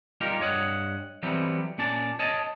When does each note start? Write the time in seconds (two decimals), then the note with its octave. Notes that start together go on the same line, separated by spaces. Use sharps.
0.21 G3 D#4 F4 G4 A#4
0.40 G2 C#5 D#5 F#5
1.23 E3 F#3 G3 B3 C4
1.78 A#2 C#4 D5 A5
2.19 C#5 D#5 A5